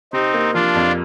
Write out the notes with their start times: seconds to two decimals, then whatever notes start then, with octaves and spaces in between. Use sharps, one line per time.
0.13 C3 C4 D#4
0.34 A#3
0.54 F3 D4 F4
0.75 F2